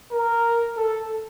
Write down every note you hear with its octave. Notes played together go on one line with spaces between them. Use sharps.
A#4
A4